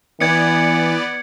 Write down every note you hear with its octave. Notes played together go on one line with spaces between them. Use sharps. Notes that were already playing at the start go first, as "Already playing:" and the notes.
E3 B3 D5 G#6 C#7